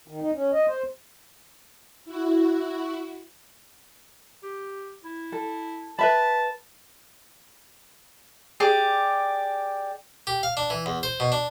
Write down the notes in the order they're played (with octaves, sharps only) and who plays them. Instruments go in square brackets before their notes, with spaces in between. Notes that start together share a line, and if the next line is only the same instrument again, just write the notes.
[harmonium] D#3
D#4
C#4
D#5
C5
[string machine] E4 F#4
[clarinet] G4
E4
[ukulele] A4
[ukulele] B4 E5 B5 [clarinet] A5
[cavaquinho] G4 G#4 D5
[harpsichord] G4
F5
D4
E3
E2
C5
B2
D4